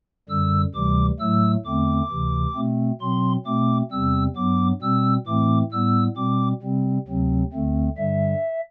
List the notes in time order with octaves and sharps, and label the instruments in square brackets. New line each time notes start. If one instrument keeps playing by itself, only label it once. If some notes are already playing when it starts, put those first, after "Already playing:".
[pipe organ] F#2 D3 G3 E6
D2 C3 E3 G3 D6
A2 F#3 A3 E6
E2 D3 A3 C4 D6
D2 C3 E3
B2 A3 C4
B2 F#3 C4 C6
B2 A3 C4 D6
E2 C3 G3 C4 E6
G2 F#3 B3 D6
B2 G3 C4 E6
A2 E3 A3 C4 D6
A2 G3 B3 E6
B2 G3 C4 D6
C3 G3 C4
D2 C3 F#3 C4
D2 D3 A3 C4
G2 D3 G3 E5